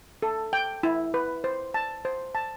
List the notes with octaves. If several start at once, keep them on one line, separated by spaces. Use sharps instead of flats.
A4
G5
E4
B4
C5
A5
C5
A5